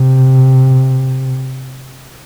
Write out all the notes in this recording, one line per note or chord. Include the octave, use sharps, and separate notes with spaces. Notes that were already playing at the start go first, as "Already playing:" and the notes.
Already playing: C3